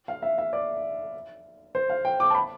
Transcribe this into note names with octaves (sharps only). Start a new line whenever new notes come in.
F5
E5
E5
D5
C5
F5
G5
D6
A5
B5